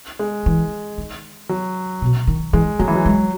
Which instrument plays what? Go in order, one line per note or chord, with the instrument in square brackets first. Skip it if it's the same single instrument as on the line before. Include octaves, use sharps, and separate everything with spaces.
[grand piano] G#3
[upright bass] E3
D#3
[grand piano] F#3
[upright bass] B2
D#3
[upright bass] E3 [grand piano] G#3
[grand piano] F#3 [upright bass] A3
[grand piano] E3
F#3
[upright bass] G#3